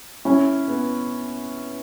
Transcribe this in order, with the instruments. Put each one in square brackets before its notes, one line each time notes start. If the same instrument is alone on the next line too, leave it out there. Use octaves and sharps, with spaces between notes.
[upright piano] C#4 [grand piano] E4
[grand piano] B3